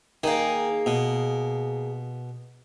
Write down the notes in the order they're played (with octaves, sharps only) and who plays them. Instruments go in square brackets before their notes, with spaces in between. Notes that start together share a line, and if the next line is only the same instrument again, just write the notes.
[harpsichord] D#3 [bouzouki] A#3 G#4
[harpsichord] B2